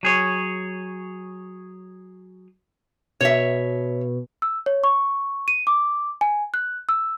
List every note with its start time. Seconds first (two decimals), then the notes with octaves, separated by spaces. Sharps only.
0.03 F#3 G#4 C#5
3.21 B2 C#5 E5
4.42 E6
4.66 C#5
4.84 C#6
5.48 D#7
5.67 D6
6.21 G#5
6.54 F#6
6.89 E6